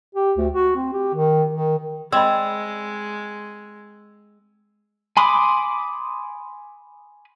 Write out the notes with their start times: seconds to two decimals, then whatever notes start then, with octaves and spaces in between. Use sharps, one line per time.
0.15 G4
0.37 D2
0.53 F#4
0.76 C4
0.93 G4
1.15 D#3
1.52 D#3
2.13 G#3 C4 D5 D#5 B5 E6
5.17 G#5 B5 C6 D6 D#6